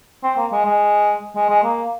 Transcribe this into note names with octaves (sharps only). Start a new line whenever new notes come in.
C4
A#3
G#3
G#3
G#3
G#3
A#3